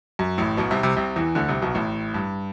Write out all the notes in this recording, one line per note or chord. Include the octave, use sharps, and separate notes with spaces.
F#2
A1 A2
B1 B2
C2 C3
C2 C3
C2 C3
E2 E3
D2 D3
C2 C3
B1 B2
A1 A2
G2